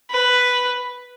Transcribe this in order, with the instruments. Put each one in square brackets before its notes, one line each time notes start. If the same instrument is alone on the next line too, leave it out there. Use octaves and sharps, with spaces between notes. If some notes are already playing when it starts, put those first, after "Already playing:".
[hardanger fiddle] B4